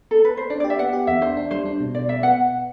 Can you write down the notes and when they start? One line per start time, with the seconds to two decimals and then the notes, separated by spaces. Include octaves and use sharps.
0.11 A4
0.24 B4
0.37 C5
0.50 D4 D5
0.60 D5
0.64 G4
0.70 E5
0.79 B3 F#5
0.93 G4
1.07 E2 E5
1.22 D4 C5
1.37 D4
1.51 G3 C5
1.65 D4
1.80 B2
1.95 B2 D5
2.08 B2 E5
2.23 B3 F#5